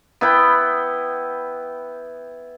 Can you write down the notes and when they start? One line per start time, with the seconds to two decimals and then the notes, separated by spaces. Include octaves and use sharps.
0.21 B3 E4 G5 B5